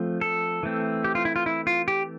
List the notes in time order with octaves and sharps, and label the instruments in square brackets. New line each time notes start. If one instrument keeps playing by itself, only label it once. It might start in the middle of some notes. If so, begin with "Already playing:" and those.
Already playing: [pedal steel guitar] F3 A3 C4
A4
E3 A3 C4
G4
F4
E4
F4
E4
F4
G4